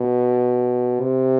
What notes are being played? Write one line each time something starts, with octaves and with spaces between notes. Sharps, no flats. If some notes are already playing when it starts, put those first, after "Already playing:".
Already playing: B2
C3